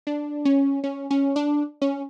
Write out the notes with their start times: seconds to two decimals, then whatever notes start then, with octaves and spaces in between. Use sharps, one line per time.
0.07 D4
0.45 C#4
0.84 C#4
1.11 C#4
1.36 D4
1.82 C#4